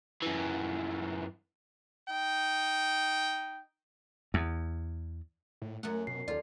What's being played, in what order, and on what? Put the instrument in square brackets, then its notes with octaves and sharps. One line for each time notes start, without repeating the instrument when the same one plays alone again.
[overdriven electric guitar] F#2 E3
[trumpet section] D#4 G5
[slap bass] E2
[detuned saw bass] A2
[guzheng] F#2 F#5 [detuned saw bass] A3
[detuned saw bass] B2 [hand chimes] C7
[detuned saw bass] D#2 [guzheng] F4 [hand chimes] A4 D5